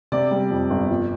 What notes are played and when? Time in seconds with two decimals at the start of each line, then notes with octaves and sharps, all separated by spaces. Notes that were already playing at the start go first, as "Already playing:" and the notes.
0.12 C3 D5
0.31 G3
0.51 F2
0.70 G1
0.91 F3